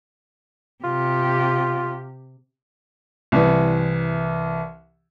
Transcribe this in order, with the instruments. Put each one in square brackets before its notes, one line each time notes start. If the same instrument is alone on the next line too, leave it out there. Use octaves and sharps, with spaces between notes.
[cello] C3 G4 [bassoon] F4
[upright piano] C2 E3